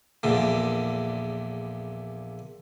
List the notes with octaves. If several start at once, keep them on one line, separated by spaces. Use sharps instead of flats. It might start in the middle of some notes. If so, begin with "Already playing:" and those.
A#1 E2 A#2 D3